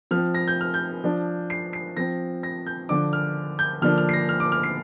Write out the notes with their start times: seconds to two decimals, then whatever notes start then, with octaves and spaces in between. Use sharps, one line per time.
0.11 F3 C4 F6
0.34 A#6
0.48 G6
0.61 F6
0.74 G6
1.04 F3 D4
1.50 C7
1.73 C7
1.97 F3 C4 A#6
2.43 A#6
2.67 G6
2.89 D3 F3 D4 D6
3.13 F6
3.59 G6
3.82 D3 F3 A#3 D4 F6
3.98 F6
4.09 C7
4.13 A#6
4.29 F6
4.40 D6
4.52 F6
4.63 C7